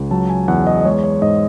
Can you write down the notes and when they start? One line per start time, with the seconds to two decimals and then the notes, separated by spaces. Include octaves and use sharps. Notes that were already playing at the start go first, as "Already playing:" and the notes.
Already playing: C#2
0.11 F#3 A5
0.30 G#5
0.48 E2 F#5
0.67 D#5
0.81 D#5
0.85 G#3 C#5
1.04 C#5
1.22 G#2 D#5